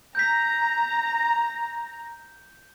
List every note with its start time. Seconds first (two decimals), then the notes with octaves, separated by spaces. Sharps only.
0.15 A#5 G6 B6